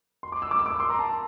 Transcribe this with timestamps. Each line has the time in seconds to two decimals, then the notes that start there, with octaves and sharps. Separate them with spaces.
0.23 C6
0.32 D6
0.42 E6
0.51 D6
0.59 E6
0.66 D6
0.80 C6
0.90 A#5
0.99 A5